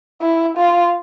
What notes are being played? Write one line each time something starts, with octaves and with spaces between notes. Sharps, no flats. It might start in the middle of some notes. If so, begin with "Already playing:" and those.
E4
F4